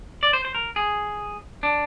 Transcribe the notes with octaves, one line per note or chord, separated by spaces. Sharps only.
D5
C5
C5
A#4
G#4
D4